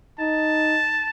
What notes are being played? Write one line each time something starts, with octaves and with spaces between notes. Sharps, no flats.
D#4 A5